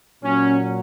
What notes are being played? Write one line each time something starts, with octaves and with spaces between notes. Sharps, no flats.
A#2 F#3 C#4